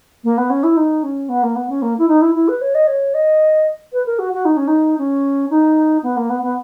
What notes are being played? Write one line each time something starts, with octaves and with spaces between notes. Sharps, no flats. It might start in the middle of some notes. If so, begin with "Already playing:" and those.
A#3
B3
C#4
E4
D#4
C#4
B3
A#3
B3
C#4
A#3
E4
D#4
E4
E4
B4
C#5
D#5
C#5
D#5
B4
A#4
F#4
F#4
D#4
C#4
D#4
C#4
D#4
B3
A#3
B3
B3